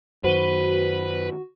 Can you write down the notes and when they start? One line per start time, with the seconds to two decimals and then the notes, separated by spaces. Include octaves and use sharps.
0.24 F#2 D#3 F#4 B4 C5 D#7 G7